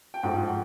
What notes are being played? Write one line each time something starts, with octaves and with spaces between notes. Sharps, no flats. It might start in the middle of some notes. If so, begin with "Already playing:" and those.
G5
G#2 F3 A3 F#5